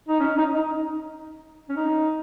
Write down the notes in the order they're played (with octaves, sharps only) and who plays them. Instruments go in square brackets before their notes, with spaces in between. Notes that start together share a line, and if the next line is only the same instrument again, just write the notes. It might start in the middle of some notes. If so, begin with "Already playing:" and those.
[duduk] D#4
C#4
D#4
D#4
C#4
D#4